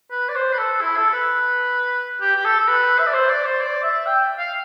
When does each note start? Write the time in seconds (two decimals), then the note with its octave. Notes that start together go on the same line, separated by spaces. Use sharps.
0.11 B4
0.29 D5
0.35 C5
0.53 B4
0.58 A4
0.81 E4
0.97 A4
1.13 B4
2.21 G4
2.36 G4
2.45 A4
2.60 A4
2.68 B4
2.99 E5
3.07 D5
3.13 C5
3.29 D5
3.45 C5
3.61 D5
3.83 E5
4.06 G5
4.38 F5